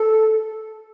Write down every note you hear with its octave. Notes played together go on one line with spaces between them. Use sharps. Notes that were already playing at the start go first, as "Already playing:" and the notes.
Already playing: A4